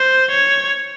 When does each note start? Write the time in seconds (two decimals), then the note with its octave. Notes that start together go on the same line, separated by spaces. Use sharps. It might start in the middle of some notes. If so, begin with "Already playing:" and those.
Already playing: C5
0.31 C#5